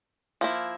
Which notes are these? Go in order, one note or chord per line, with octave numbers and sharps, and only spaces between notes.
F3 A#3 E4